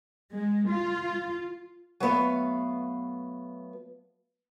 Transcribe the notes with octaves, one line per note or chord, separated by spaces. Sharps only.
G#3
F4
F#3 A3 B3 F5